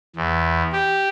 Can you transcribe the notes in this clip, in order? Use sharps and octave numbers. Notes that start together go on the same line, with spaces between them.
E2
G4